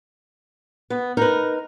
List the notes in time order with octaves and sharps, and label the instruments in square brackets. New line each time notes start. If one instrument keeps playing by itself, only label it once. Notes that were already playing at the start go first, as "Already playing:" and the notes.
[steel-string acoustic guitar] B3
[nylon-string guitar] D#4 B4 [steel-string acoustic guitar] A#4